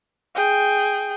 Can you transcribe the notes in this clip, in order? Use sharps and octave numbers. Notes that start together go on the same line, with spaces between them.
G#4 G5